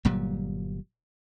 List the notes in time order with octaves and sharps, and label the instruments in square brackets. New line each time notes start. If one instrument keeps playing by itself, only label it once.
[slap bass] G1 A#2 F#3 G3